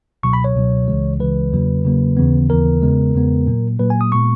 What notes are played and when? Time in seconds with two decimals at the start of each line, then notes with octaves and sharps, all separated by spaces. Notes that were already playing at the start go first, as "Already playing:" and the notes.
0.23 C#2 B2 F#3 C#6
0.33 B5
0.44 C#5
0.55 C#2 B2 F#3
0.88 C#2 C#3 E3 G#3
1.20 C#2 C#3 E3 G#3 B4
1.52 E2 C#3 F#3 A#3
1.85 E2 C#3 F#3 A#3
2.17 D#2 C#3 E3 B3
2.50 D#2 C#3 E3 B3 A#4
2.82 E2 C#3 G#3 B3
3.14 E2 C#3 G#3 B3
3.47 A#2 F#3 A#3
3.79 A#2 F#3 A#3 B4
3.90 G#5
4.01 D#6
4.12 A#2 G#3 B3 C#6